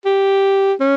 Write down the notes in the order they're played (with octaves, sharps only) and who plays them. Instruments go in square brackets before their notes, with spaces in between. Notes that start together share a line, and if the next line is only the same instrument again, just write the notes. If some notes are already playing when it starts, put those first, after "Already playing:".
[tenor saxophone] G4
C#4